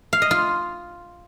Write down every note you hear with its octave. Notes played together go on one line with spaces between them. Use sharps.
F5
D#5
F4